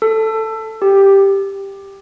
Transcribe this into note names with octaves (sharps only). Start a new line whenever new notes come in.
A4
G4